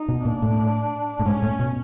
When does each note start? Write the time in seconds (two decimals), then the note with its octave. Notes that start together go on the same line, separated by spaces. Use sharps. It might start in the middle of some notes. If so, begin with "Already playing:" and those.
Already playing: D#4
0.08 B2
0.25 A#2 D4
0.42 A2
1.19 A2
1.25 G#2 C#4
1.42 A2
1.59 B2